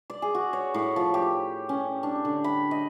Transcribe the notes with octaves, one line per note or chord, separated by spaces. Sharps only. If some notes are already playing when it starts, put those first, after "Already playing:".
D5
G#4
F#4
C#5
A2
F3
G4
C#4
D4
D3
B5
D#5